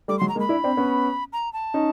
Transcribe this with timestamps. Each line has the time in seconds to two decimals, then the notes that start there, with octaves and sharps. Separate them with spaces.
0.08 G3 A3 D6
0.19 F#3 G#3 C6
0.29 A#5
0.35 G#3 A#3
0.40 B5
0.49 D4 E4
0.64 C4 D4
0.77 B3 C#4
1.33 A#5
1.53 A5
1.74 C#4 D#4